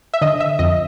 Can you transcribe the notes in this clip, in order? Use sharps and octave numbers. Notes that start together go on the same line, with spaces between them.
E5
D3 D#5
E5
F2 D#5